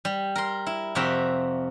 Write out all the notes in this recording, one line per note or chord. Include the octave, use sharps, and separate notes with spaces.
G3
A#4 C6
E4
F2 C3 F#4 A#4 E5 G5